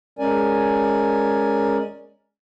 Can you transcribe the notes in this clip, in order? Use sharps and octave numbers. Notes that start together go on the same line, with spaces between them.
G#3 C#4 A#4 D5 G#5